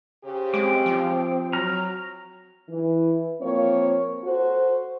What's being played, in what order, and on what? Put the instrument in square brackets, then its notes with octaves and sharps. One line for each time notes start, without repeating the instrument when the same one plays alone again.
[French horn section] C#3 G4 C5
[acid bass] G#3 [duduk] C4 [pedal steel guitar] D6
[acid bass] F3
[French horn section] F#3 [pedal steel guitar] A#5 F6
[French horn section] E3
F3 A#3 C4 C#5
F#4 A4 C5